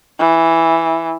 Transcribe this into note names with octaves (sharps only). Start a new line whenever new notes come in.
E3